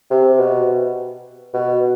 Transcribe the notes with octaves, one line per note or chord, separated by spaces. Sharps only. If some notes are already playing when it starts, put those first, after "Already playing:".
C3
B2
B2